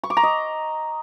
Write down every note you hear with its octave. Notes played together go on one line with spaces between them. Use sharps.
C#6
D6
A#5
D#5